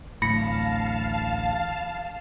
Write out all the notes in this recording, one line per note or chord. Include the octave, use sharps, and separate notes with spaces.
A1 D2 A2 F5 A5 B5 A#6 C#7